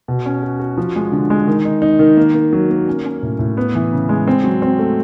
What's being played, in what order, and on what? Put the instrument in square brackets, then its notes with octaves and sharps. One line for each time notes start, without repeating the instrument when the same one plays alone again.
[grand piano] B2
C#4
F#4
F#4
F3
G#3
D3
G#3
D#3
D#4
D#4
D#3
A#3
A#3
F#3
A#3
C#4
C#4
A2
A2
B3
E3
C#3
G#3
C4
F#3
C4
A3